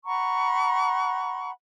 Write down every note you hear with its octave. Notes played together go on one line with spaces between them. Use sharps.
F#5 A#5 B5 C#6